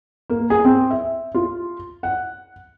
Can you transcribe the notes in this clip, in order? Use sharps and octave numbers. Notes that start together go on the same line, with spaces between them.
A#3
G#4
C4
E5
F4
F#5